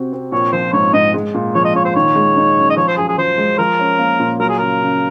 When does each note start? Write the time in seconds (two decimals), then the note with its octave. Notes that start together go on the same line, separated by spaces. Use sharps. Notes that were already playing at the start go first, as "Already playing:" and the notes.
Already playing: C3 C4 F#4
0.13 C4
0.32 A#1 C#5
0.52 F3 C5
0.73 G#2 C#5
0.93 G#2 D#5
1.14 G#3
1.34 A#2
1.55 F3 C#5
1.65 D#5
1.75 A#2 C#5
1.85 C5
1.95 D#3 C#5
2.15 G#3
2.36 D#4
2.57 F#2
2.70 D#5
2.77 F3 C#5
2.88 C5
2.97 F#2 G#4
3.08 G#4
3.18 F3 C5
3.38 G#3
3.59 F3 A#4
3.79 C#4
3.99 A#3
4.19 A#2
4.40 F#3 A#4
4.49 G#4
4.59 C#3 A#4
4.82 C#3